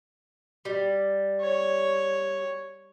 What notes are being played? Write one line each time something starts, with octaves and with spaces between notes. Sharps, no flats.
G3
C#5